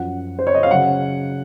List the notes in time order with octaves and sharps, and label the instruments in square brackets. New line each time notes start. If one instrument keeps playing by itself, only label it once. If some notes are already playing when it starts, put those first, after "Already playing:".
Already playing: [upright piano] F#2 F3 F#5
C5
C#5
D#5
F5
C#3 F#3 F#5